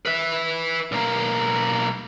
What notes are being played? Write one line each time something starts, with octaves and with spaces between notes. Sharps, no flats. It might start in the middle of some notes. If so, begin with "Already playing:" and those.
B4 E5
B1 A#3